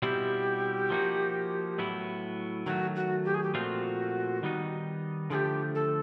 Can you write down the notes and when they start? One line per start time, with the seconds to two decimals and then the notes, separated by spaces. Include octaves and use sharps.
0.02 B2 G3 C4 E4 G4
0.90 F3 A#3 D#4 F#4
1.78 A2 F#3 B3 E4
2.66 D#3 F#3 A3 F#4
2.96 F#4
3.25 G4
3.34 G#4
3.43 G4
3.54 A#2 F3 A3 C4 F4 F#4
4.43 D#3 G3 B3 D#4
5.30 D3 F3 A3 G4 G#4
5.75 A4